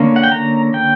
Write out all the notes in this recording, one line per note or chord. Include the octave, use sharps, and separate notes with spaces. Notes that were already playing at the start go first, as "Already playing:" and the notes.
Already playing: D3 A#3 C#4
F#5
G5
A#5
G5